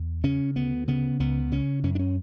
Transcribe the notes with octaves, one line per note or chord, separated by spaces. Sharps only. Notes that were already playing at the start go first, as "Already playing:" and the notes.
Already playing: E2
C#3 C#4
D2 B3
C#3 B3
C#2 B3
C#3 C#4
F#2 C#4
D4
C#4